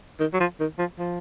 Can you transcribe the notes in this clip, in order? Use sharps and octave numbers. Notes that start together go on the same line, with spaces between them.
D#3
F#3
F3
D#3
F3
F3